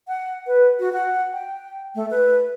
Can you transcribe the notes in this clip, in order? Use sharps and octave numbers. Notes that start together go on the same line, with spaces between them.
F#5
B4
F#4
F#5
G5
A3
B4